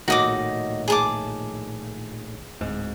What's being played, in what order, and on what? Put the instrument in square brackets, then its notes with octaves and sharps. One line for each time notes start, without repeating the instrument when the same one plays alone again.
[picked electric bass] A#1 A2 D#3 [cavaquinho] F#4 D#5 D6
[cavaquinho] G#4 A5 D6
[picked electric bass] D1 G#2